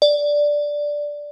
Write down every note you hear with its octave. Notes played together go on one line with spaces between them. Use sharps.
D5